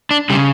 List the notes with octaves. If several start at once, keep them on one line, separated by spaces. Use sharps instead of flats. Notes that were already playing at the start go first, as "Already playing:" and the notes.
D4
C#3 G3